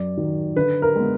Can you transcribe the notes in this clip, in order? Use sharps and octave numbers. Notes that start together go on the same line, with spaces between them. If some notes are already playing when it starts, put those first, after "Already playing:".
Already playing: F#2 D5
D#3 F#3
D3 B4
A#4
G#3 B3